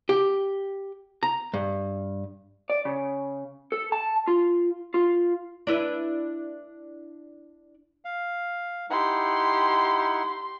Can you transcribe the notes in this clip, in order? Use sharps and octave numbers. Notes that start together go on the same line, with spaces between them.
G4
A#5
G2
D5
C#3
A4
A5
F4
F4
D4 E4 B4
F5
D#4 E4 G4 F#5 C6